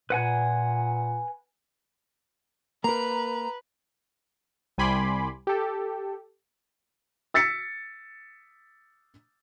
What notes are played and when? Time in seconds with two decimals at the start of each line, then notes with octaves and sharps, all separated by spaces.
0.10 A#2 B4 F#5 G#5
2.84 A#3 A#4 B4 A#5
4.78 C2 G3 G#5 B5 C6 D6
5.47 G4 A4
7.34 E6 A6 B6 C#7